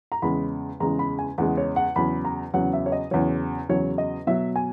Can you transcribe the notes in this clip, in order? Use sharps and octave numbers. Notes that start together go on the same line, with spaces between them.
A#5
E2 C#3 G#3 B5
E2 C#3 G#3 A#5
B5
G#5
E2 C#3 G#3 F#5
C#5
F#5
E2 C#3 F#3 B5
A#5
E2 C#3 F#3 F#5
E5
C#5
D#5
E2 C#3 F#3 C#5
E2 C#3 F#3 C#5
D#5
B2 F#3 E5
G#5